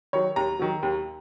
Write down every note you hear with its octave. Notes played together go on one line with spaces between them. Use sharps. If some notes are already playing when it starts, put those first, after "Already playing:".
D#3 F#3 C#5
D#2 A#5
D#3 F#3
D#2